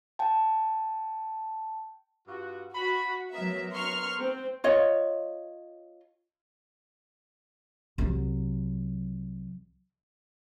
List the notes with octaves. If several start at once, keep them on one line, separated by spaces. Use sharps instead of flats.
G5 A5
G2 F4 F#4
F#4 B5
F#3 B3 A#4 E5 A#5
C6 C#6 F6
C4
F4 C#5 D#5
C2 F#3